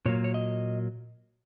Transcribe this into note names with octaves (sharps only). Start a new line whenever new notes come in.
A#2 F#3 A#3 C#5
C#5
D#5